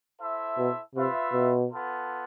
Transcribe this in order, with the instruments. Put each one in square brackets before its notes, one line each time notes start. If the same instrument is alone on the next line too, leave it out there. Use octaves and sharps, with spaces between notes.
[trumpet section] E4 A4 C5 E5
[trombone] B2
[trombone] C3 [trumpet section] F4 B4 E5
[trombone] B2
[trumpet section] B3 F4 A4